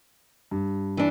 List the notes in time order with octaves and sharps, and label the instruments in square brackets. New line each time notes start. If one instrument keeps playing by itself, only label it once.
[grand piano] G2
[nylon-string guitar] E3 D4